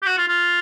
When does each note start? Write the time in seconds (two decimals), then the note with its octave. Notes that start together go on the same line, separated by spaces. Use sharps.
0.02 G4
0.06 F#4
0.18 F4
0.28 F4